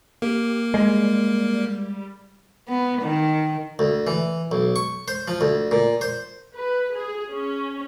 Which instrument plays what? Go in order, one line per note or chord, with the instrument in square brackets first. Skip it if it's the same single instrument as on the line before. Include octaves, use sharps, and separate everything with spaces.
[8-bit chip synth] A#3 [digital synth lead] G4
[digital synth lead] G3 [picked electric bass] G#3
[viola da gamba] B3
D#3
[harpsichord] D2
E3
B1
C#6
C5
F3
D2
A#2
C5
[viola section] B4
G#4
C#4